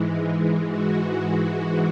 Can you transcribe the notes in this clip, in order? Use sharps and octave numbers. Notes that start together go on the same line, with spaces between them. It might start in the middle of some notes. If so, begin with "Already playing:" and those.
Already playing: G#2 E3 G#3
F#4